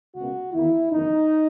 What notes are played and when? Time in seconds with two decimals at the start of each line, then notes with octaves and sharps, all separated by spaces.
0.15 C#2 B2 A#3 F#4
0.52 E2 D#3 A#3 E4
0.90 F#1 E2 D#3 G#3 D#4